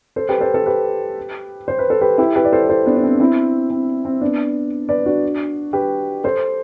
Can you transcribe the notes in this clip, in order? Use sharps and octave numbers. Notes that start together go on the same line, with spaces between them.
A4 C5
G4 B4
A4 C5
A4 C5
G4 B4
C5
B4
A4
G4 B4
E4 G4
G4 B4
D5
A4 C5
B4
A4 C5
B3 D4
D4
C4
D4
C4 E4
C4
C4
B3 D4
B4 D5
D4 F#4
G4 B4
A4 C5